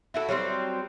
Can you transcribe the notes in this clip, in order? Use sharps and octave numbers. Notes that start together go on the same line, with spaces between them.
E4 F#4 A4
F#3 G3 A#3 C4